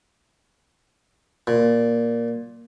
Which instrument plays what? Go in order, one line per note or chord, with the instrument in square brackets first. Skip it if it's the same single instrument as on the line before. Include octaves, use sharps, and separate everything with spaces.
[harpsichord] A#2